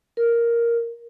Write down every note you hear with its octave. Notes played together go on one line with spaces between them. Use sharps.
A#4